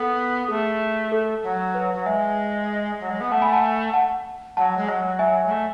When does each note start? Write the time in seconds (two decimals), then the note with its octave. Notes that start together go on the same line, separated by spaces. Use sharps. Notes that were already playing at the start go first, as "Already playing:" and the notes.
Already playing: B3 A4
0.48 A3 G#4
1.12 A4
1.43 F#3
1.74 B4
1.94 F#3
2.06 G#3 E5 G#5
3.00 F#3
3.10 G#3
3.20 B3
3.31 A3 F#5 A5
3.42 G#5 B5
3.52 F#5 A5
3.94 F#5 A5
4.57 F#3 F#5 A5
4.77 G#3
4.88 F#3
5.19 E5 G#5
5.46 G#3
5.51 A3